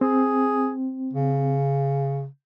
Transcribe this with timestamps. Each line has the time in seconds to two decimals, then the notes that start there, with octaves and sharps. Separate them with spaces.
0.01 C4 G#4
1.13 C#3